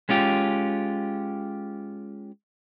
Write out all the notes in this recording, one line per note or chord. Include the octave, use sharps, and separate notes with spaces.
G#3 C#4 F4 G4